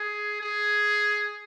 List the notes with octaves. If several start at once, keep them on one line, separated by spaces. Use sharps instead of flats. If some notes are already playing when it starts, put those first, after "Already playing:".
Already playing: G#4
G#4